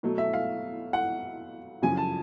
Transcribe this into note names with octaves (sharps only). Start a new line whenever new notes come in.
B2 F#3 A3
E5
F5
F#5
F#2 C#3 F3 G#5
A5